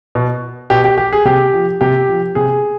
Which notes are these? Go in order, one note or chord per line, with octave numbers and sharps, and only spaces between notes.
B2
B2 G4
G4
G4
G#4
C3 G4
F3
C3 G4
F3
C3 G#4